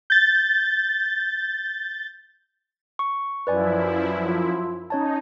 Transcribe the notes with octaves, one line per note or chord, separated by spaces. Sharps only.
G6 A6
C#6
F#2 F3 E4 B4 D5 G#5
F4
C#4 D#4 C#5 A5